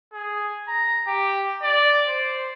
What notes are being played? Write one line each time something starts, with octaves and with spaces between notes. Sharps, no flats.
G#4
A#5
G4
D5
C5